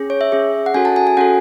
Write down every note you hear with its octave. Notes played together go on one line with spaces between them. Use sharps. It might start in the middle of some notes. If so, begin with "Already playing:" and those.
Already playing: C#4 G#4
C#5
E5
C#4 G#4
F#5
C#4 F#4 A4 G#5
A5
G#5
G#5
C#4 F#4 A4 F#5